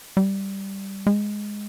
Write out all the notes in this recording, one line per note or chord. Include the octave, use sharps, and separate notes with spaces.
G3
G#3